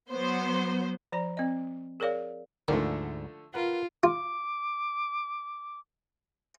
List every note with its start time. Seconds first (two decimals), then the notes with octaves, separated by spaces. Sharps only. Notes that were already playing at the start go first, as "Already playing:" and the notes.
0.10 F#3 B3 C5
1.12 F3 D5 A#5
1.37 C4 D#5
2.00 G#4 A#4 C#5 D5 F5
2.68 D2 G#2 D3 D#3 F3 A3
3.54 F4 A#4 B4 F#5
4.03 F4 D6